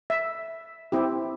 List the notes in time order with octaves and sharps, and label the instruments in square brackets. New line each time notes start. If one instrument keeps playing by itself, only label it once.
[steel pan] E5
C4 E4 G4